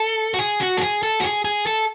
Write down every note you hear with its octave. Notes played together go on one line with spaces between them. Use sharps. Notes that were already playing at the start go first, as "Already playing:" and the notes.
Already playing: A4
F#4
G#4
F#4
A4
G#4
A4
F#4
G#4
G#4
A4